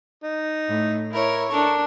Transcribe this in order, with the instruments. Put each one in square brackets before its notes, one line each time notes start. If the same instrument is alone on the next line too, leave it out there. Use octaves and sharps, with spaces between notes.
[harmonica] D#4
[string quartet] A2
E4 A#4 C#5
[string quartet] D4 A#4 [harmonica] A4 C#6